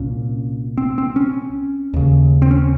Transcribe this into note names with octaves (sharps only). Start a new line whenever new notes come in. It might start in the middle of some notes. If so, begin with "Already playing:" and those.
Already playing: C2 A#2 C#4
C4
C4
C#4
D#2 C#3
C4
C#4